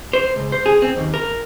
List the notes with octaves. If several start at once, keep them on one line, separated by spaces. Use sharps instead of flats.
C5
C#2
C5
G#4
C4
D#2
A#4